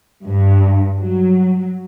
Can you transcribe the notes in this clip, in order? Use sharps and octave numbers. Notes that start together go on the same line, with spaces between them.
G2
F#3